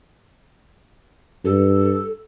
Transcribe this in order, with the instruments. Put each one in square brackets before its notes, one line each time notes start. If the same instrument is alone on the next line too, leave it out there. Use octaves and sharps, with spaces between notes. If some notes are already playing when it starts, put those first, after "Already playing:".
[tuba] G2 [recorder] A4